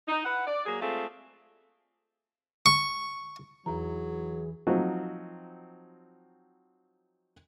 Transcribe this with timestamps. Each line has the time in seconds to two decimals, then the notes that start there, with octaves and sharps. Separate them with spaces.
0.07 D#4
0.25 E4 B4 F#5
0.47 D5
0.66 F#3 A#3 G#4
0.82 G#3 A3 C4 F4 G#4
2.66 C#6
3.66 E2 E3 F#3 G#4 A#5
4.67 F3 F#3 C4 D#4 F#4